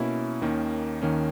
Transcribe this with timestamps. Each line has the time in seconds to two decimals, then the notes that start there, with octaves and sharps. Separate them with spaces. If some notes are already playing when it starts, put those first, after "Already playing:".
Already playing: B2 A#3 C#4 E4
0.42 D#2 D#3 A#3 C#4
1.02 D#2 D#3 A#3 C#4